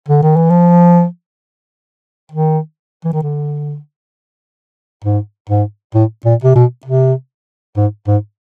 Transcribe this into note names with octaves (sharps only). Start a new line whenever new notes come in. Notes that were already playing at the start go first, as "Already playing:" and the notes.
D3
D#3
E3
F3
D#3
E3
D#3
D3
G#2
G#2
A2
A#2
C3
B2
C3
G#2
G#2